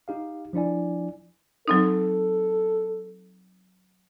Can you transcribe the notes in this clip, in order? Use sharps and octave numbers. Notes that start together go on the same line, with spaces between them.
D#4 G4 F5
F3 D4 E4 D5 G#5
F#3 C4 D#4 A4